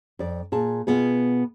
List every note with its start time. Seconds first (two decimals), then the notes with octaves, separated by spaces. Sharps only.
0.19 F2 D5
0.52 A#2 G#4 A5
0.87 B2 B3 F4 G#4